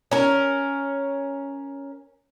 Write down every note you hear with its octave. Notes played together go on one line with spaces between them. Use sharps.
C#4 A#4